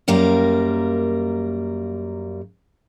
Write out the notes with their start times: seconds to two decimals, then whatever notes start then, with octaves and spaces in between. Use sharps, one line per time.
0.08 F#2 G3 A#3 A#4 F5